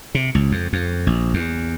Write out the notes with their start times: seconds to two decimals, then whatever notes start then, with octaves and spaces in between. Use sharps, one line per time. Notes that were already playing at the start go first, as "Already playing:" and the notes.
0.15 C3
0.35 C#2
0.52 F2
0.73 F2
1.07 A#1
1.34 E2